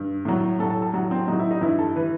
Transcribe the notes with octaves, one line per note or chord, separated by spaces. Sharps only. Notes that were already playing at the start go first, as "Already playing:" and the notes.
Already playing: G2
A2 F#3
A2 F#3 A4
A4
A4
A2 F#3 F#4
C4
A2 F#3 D#4
E4
D#4
G2 E3 E4
A4
E3 B4